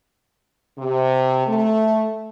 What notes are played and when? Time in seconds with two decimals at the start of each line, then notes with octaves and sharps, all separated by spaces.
0.78 C3
1.47 A3